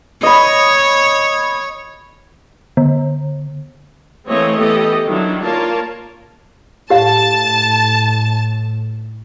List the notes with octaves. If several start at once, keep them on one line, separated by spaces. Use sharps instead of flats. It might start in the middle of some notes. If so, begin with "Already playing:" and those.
C#5 D#5 B5
D3
E3 A3 A#3 C4 C#5 D#5
E3 B3 G4 A4 D#5
D#3 F#3 D4 E4
A#3 F4 A#4 C#5 D5 A5
A2 G4 F5 A5